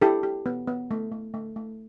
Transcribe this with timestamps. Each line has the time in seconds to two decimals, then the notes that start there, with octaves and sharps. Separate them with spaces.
0.01 E4 G4 A4
0.23 G4
0.46 B3
0.67 B3
0.91 A3
1.12 A3
1.34 A3
1.56 A3